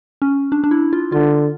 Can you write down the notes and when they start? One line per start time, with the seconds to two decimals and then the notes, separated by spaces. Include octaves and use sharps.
0.22 C#4
0.52 D4
0.64 D4
0.71 E4
0.93 F4
1.12 D3 F4